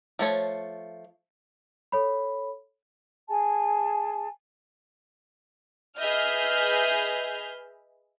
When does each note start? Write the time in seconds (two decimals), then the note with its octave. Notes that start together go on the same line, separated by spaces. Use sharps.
0.19 F3 A3 C#5
1.92 A4 C#5 B5
3.29 G#4 G#5 A5
5.98 G#4 B4 D#5 E5 F6 G6